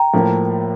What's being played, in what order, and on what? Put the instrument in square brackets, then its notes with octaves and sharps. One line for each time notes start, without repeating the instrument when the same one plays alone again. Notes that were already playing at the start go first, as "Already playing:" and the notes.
Already playing: [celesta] G5 A#5
[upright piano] A2 F3 A#3